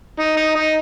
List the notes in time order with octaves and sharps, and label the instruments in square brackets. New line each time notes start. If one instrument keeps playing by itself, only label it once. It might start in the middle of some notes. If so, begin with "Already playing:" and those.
[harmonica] D#4
D#4
D#4